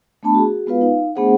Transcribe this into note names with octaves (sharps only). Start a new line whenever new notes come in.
A3 B3 D4 A5 B5
F#4 G#4
G#3 B3 F4 B4 F5
D#4 F5
A3 B3 D4 G#4 C5 F#5